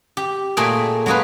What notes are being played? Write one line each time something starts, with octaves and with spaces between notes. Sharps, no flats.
G4
A#2 A3 A#3 G#4 G5
F#3 G#3 A#3 G#4 B4